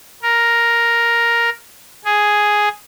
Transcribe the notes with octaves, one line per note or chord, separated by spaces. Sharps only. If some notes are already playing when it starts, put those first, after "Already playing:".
A#4
G#4